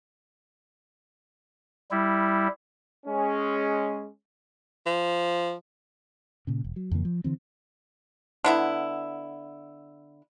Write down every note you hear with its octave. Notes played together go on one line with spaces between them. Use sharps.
G3 E4
G#3 C#4
F3
A#2 C#3
E1
F#3
F2 C#3 E3 A#3
F3
D3 E3 C4
D3 B3 E4